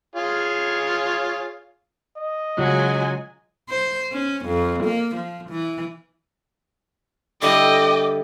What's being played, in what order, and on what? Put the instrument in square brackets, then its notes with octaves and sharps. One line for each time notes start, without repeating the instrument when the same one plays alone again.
[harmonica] F4 G#4 C#5
[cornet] D#5
[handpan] C#3 F4 [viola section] F#3 G#3 G#5
[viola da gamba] C5
C#4
F2
A#3
F3
E3
[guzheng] D3 G3 E4 [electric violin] D#5 G5 [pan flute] D6